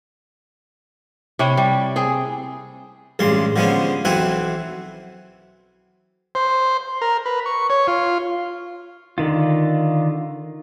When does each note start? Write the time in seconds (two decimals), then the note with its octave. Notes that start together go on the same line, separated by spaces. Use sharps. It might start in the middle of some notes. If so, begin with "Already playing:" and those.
1.39 C3 E4 C#5 G5
1.57 G3
1.96 C4 G#4
3.19 A1 G2 C#3 G#3 C6
3.56 D3 F3 G#3 B3 C#4
4.05 B1 E3 C4 E4 F#5 G#5
6.35 C5
7.01 A#4
7.26 B4
7.46 C#6
7.70 C#5
7.87 F4
9.18 D3 D#3 F4